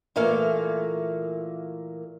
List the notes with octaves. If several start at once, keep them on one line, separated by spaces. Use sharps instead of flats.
A#2 E3 A3 A#3 F5